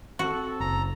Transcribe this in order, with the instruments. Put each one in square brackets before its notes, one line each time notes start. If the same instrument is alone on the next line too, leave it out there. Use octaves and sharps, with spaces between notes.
[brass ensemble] C4 A4 [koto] F#4
[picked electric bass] F#1 [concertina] A#5